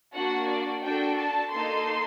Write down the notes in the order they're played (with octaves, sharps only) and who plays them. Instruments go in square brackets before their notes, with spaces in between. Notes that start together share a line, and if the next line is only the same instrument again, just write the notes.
[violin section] A#3 D4 F#4 F#5
D5
D4 F#4 A4 G5
A5
A#3 D#4 A4 C6